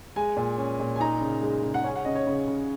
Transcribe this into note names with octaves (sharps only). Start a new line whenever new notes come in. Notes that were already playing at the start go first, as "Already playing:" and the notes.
G#3 G#5
A#2
C#4
A#2
G#5
D#4 A#5
C#3
G#3
C#3
F#5
C#4 G#5
F#5
C#3 D#5
C#5
C#3
C#3